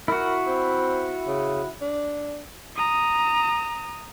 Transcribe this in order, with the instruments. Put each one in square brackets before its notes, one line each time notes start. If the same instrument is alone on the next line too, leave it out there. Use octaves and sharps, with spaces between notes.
[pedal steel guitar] E4 F#4 [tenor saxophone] A#4
[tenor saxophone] C4
C#3
D4
[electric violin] A#5 D#6